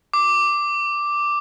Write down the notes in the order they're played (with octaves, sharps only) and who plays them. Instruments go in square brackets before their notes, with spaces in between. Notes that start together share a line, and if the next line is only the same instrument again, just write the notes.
[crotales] D6